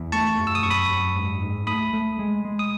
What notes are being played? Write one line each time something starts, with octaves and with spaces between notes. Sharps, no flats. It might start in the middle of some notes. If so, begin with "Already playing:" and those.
Already playing: E2
A3 A5 C#6
F#2
E6
D#6
F#2 C#6
B5 D#6
F#2
G#2
G#2
A3 B5 D#6
A3
G#3
G#3
D#6